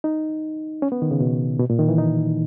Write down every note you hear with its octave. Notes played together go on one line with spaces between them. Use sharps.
D#4
C#4
B3
D#3
C#3
B2
B2
A#2
D#3
E3
D#4